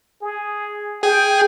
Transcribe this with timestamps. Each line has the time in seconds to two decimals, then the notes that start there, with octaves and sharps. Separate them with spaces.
0.22 G#4
1.03 G#4 G5 G#6